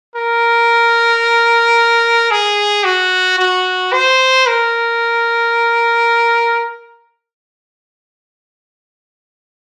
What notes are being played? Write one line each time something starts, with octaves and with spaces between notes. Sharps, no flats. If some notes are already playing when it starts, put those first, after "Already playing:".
A#4
G#4
F#4
F#4
C5
A#4